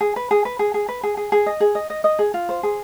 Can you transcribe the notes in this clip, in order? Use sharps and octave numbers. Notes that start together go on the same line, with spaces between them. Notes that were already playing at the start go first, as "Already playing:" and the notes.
G#4
B4
G#4
B4
G#4
G#4
B4
G#4
G#4
G#4
D#5
G#4
D#5
D#5
D#5
G#4
F4
C5
G#4